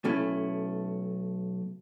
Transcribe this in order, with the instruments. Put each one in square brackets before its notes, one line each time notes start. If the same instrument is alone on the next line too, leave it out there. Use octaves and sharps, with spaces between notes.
[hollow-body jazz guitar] B1 A3 C#4 E4